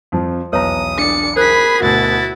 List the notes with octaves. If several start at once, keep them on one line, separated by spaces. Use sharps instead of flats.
F2 F3
B1 E2 B4 C#5 A#5 D#6
D4 D5 C#7
G#4 A#4 C5 B5 F#6 B6
D2 B2 E4 F#4 A6